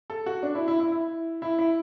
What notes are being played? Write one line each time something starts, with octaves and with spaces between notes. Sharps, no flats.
A4
F#4
D4
E4
E4
E4
E4
E4
E4